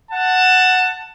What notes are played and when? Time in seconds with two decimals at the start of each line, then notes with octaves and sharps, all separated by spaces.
0.11 F#5 A5